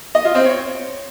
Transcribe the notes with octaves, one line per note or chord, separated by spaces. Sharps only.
D#5
F4
C4
C#5